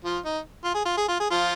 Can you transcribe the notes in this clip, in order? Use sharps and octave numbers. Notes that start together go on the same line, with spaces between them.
F3 F4
D#4
F4
G#4
F4
G#4
F4
G#4
F3 F4